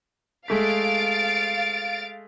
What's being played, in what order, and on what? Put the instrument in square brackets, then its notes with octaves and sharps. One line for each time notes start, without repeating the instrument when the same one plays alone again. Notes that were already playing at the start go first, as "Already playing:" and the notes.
[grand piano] G#3 A3 B6 [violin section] F5 A6 D7